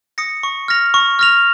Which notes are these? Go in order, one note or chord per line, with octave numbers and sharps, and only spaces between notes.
D#6 A#6 C#7
C#6
F6 A#6 F7
C#6
F6 A#6 F7